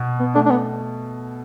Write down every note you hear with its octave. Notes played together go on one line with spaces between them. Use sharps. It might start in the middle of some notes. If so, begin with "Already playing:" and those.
Already playing: B2
B3
A3 D4
D4
B3